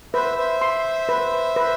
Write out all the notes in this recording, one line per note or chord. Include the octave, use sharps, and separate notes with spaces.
B4 C5 E5
C5 E5
C6
B4
B4